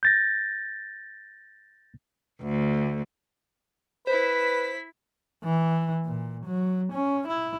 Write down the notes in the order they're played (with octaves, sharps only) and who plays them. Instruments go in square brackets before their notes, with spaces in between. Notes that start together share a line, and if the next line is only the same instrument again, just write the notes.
[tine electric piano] G6 A6 A#6
[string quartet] D2
[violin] E4 B6 [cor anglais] B4 [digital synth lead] C5
[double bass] E3
A#2
F#3
C#4
E4